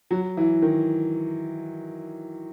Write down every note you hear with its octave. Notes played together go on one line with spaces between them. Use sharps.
F#3
E3
D#3